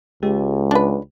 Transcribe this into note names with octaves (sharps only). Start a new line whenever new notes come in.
C#2 G#3 G4
D4 B4